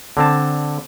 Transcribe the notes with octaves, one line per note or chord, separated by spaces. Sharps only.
D3 C4 A5